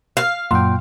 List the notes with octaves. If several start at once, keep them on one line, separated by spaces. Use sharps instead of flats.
F5
F#2 A#2 F#5 G5 C6